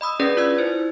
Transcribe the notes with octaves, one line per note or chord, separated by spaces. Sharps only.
D#5 B5 D#6 E6
C#4 D4 G#4 B4 D5
F4 D5 E6 G#6
E4 C5